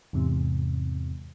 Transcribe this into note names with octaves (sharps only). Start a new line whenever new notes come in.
E2 G#2 C3